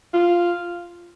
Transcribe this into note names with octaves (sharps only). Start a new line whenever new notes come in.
F4